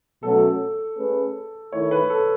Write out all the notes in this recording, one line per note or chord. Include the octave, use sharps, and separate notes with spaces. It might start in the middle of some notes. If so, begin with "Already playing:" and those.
B2 F#3 A3 C#4 A4
A3 C#4 G#4 B4
D#3 A3 E4 C#5
B4
A4